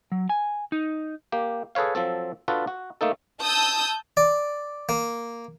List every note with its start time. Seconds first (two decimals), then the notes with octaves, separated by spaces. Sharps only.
0.12 F#3
0.29 G#5
0.72 D#4
1.32 A#3 G4
1.75 G#4 A4 B4 C#5 F5
1.95 F3 F#3 C4 A4
2.48 D4 F4 F#4 A4 B4
2.67 F#4
3.01 A3 A#3 D#4 A4
3.41 A5 D#6 E6 G6
4.17 D5
4.89 A#3